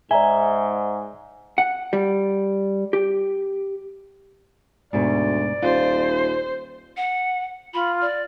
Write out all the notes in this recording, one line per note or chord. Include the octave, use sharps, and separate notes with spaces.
G#2 D5 E5 G#5 A#5 G7
F#5
G3
G4
D2 G#2 B2 D5
D#1 F4 C5
F#5
F4 B5
D5